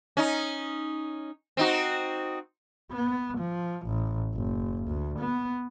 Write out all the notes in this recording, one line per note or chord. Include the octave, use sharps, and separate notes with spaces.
C#4 D#4
C4 D#4 F#4
B3
F3
A1
F#1
D2
B3